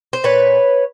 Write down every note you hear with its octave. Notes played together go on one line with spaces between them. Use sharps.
C5
A#2 B4 C#5